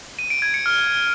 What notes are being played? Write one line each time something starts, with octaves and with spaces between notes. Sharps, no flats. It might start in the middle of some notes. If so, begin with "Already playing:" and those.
D#7
D7
G#6
C#7
F6